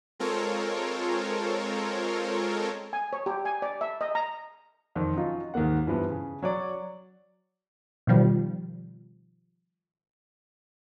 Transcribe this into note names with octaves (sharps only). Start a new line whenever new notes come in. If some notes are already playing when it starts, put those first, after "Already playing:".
G#3 C4 F4 A4 A#4 C#5
G#5
C#5
G4
G#5
D5
E5
D#5
A#5
E1 F2 D#3
F#3 C#4 D#4 F4
D#2 G#2 A#3 F#5
G2 E3 F3 B3
C#3
F#3 C#5 D5
B2 D#3 F3 G3